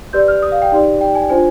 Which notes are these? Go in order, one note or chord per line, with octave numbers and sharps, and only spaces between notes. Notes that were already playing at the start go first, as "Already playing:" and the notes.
G4 B4 D5 G6
F6
D#6
F5
G5
D#4 G4 D5
G5
G#5
D4 F4 C5 G#5